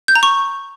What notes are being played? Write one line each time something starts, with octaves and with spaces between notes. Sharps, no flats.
G6
A#5
C#6